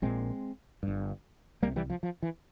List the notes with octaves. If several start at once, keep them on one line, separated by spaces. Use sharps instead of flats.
A#1 A#2 G#3 C4
G1 G2
C2 C3 G3 A#3
E3 G3
F3
F3
E3